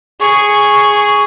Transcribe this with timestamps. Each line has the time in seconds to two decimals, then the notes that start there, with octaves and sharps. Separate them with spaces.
0.21 G#4 C#6